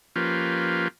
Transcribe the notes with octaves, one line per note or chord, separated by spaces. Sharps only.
F3 A#3 C#4 F4 G4 B4